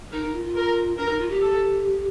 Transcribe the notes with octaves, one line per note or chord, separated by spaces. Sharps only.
D#4 A#4
D#4
F4
F4
A#4
D4 A#4
D#4
F4
G4
A4